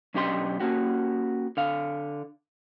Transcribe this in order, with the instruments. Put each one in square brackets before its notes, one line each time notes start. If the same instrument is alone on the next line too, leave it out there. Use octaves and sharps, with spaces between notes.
[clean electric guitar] B1 C#4 D4 G4 D#5 C6
A#3 C#4 F#4 G4
D3 F5